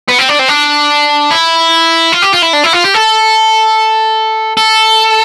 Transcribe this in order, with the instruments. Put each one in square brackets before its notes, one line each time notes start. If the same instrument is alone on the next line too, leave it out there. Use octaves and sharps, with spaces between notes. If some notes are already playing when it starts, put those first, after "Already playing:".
[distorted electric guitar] B3
C4
D4
C4
D4
E4
F4
G4
F4
E4
D4
E4
F4
G4
A4
A4